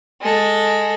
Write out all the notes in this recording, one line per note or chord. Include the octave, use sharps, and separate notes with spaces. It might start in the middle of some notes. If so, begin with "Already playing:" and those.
G#3 A4